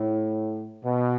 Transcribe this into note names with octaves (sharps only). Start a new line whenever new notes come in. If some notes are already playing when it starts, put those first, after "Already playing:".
Already playing: A2
B2